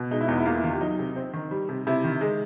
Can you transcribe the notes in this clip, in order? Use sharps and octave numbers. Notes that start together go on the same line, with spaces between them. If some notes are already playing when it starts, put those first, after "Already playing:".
Already playing: B2
G#3 D#4
E4
E2 D#4
E4
A#3 F4
E4
D#3 F4
G4
F#3 D#4
C3
C4
D#3
G3
C3
C3 E4
D#3
G#3